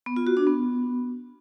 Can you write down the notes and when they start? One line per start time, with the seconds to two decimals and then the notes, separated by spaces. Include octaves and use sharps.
0.06 B3
0.16 F4
0.27 F#4
0.37 D4
0.47 B3